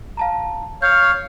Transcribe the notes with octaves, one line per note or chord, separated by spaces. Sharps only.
F5 A5 A#5
C#5 F5 G6